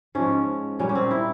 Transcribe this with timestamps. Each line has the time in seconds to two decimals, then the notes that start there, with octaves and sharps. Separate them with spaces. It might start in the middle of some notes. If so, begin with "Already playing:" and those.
0.15 G#2 F3 G#3 C#4
0.79 A#2 G3 A#3 C#4
0.89 C#4
0.95 C4
1.11 E4